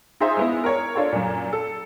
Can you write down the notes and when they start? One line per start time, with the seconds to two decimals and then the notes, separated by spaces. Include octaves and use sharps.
0.20 D#4 F4 G#4 C5 E5
0.37 G#3 B3 E4
0.64 A#4 C#5
0.95 D4 F4 A4 C#5
1.12 F#2 A#2
1.53 A4